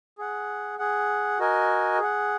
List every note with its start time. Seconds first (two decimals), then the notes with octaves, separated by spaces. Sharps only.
0.18 G#4 F#5
0.79 G#4 F#5
1.39 F#4 A#4 D#5 G#5
1.99 G#4 F#5